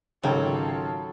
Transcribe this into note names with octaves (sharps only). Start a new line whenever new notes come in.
G#1 C#3 F#3 F4 A4 G5